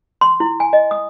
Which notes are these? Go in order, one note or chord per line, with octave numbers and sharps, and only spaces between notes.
C6
E4
G#5
D#5
D#6